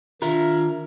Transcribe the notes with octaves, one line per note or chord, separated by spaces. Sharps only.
D#3 D4 F4 A#4 E5